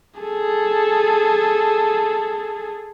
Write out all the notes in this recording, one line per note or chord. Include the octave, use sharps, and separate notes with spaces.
G#4 A4